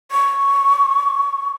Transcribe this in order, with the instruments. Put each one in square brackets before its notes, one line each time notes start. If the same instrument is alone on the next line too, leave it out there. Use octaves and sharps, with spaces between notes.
[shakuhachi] C#6